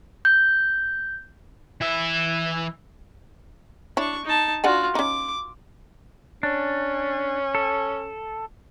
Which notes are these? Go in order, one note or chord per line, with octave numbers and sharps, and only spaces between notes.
G6
E3 E5
D4 E4 C#5 C#6
D#4 A5
D4 F4 F#4 F#5 G#5
C#4 D#4 D6
C#4 D4
A4